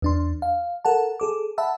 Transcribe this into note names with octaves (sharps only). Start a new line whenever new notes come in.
E2 D4 C6
F5
A4 A#4 F#5 A5
G#4 A4 D6
E5 F#5 A5 B5 E6